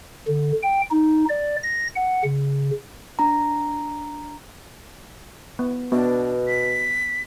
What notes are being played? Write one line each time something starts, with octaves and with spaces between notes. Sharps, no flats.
D3
G5
D#4
D5
A#6
F#5
C#3
D4 A#5
B3
B2 B3 D4
B6